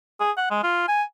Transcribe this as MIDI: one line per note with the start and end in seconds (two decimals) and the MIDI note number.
0.20 0.31 68
0.37 0.49 78
0.51 0.59 56
0.63 0.84 65
0.88 1.03 80